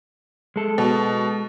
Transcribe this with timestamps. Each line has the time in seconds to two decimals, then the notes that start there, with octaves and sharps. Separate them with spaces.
0.56 G#3 A4
0.78 B2